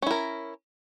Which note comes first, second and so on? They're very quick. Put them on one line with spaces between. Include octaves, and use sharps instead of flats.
C#4 E4 A#4